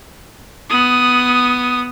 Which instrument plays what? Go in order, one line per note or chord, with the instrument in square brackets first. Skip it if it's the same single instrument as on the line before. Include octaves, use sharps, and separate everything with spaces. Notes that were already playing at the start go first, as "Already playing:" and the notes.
[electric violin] B3 D#6